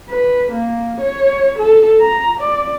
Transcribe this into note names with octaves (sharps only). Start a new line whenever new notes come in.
B4
A#3
C#5
A4
A#5
D5